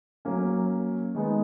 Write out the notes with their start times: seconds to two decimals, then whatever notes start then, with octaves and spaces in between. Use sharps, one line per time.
0.25 F#3 A#3 C#4
1.15 D#3 G#3 B3 D#4